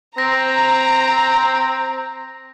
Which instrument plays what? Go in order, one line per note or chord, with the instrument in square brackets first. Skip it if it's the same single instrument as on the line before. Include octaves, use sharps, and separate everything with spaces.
[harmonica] C4 [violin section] A#5 [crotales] A#6